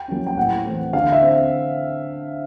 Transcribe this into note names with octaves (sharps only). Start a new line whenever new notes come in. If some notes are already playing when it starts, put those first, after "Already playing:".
Already playing: G5
F#3 A#3 C#4
G5
A2 F#5
E3 A3 C4
D3 F5
E5
C4